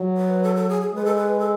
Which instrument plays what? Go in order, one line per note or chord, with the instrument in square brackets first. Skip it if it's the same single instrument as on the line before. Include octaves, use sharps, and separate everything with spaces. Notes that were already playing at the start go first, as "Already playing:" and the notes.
Already playing: [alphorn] F#3
[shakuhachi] B4
A4
A4
G#4
G#4
[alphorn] G#3 [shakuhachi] B4
[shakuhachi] A4
B4
A4